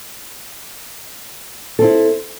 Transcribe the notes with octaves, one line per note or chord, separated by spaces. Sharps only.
C4 E4 A4